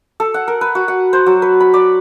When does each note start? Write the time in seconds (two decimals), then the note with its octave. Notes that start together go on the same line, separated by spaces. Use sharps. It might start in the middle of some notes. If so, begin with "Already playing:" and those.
0.20 A4
0.34 F#5
0.48 A#4
0.61 B4
0.75 F#4
0.88 F#5
1.13 C5
1.26 F#3
1.42 B4
1.60 B5
1.74 D5